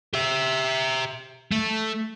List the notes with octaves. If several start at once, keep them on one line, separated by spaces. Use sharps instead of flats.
G4 E5
A3